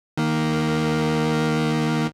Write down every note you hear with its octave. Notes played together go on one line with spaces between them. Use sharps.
D#3 A#3